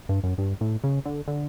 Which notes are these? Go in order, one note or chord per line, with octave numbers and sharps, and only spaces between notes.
G2
F#2
G2
A2
C#3
D3
D3